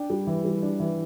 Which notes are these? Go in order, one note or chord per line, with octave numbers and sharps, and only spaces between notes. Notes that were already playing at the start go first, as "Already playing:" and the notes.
Already playing: D4 G5
G3
E3
G3
D4
E3